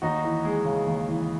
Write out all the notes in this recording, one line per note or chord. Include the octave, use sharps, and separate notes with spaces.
D#2 D#4 F#4
E3
G#3
C#3
D#2
E3